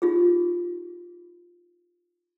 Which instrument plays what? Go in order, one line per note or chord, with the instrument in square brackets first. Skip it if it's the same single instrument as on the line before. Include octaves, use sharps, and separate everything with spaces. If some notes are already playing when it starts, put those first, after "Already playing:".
[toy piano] D#4 F4 G4 G#4